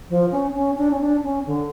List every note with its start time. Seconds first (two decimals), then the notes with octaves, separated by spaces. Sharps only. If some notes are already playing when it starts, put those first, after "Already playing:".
0.09 F3
0.31 C#4
0.55 C#4
0.78 D4
0.91 C#4
1.00 D4
1.23 C#4
1.46 D3